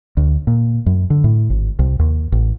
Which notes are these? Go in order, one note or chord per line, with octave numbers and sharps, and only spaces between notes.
D2
A#2
F#2
D3
A2
G#1
C2
D#2
A1